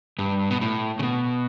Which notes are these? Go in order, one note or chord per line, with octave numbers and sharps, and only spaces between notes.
G2
B2
A2
C#3
B2